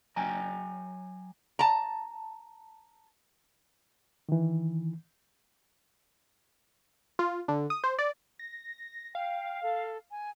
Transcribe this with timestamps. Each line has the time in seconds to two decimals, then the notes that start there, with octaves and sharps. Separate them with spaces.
0.16 F#3 G5 G#5 A#5
1.59 A5 A#5
4.29 D#3 E3
7.19 F4
7.48 D3
7.70 D#6
7.84 C5
7.99 D5
8.39 A#6
9.15 F5 G5
9.63 A4
10.11 G#5